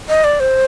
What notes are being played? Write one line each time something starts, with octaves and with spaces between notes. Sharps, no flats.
D#5
D5
C5